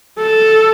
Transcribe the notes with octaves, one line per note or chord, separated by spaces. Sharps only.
A4